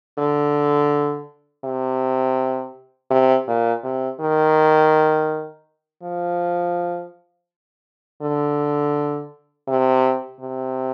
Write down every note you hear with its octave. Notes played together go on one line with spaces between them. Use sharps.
D3
C3
C3
A#2
C3
D#3
F3
D3
C3
C3